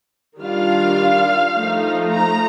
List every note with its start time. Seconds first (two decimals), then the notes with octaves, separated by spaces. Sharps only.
0.40 D#3 G3 D4 F4 F5
1.55 F3 A3 D#4
2.12 A#5